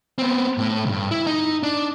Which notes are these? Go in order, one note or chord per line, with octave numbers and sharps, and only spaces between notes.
B3 C4
A2 A3
C#2 G2
E4
D#4
D4